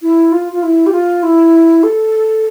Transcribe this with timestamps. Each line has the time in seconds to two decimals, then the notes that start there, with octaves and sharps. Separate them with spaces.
0.02 E4
0.32 F4
0.52 F4
0.63 E4
0.86 G4
0.92 F4
1.23 E4
1.83 A4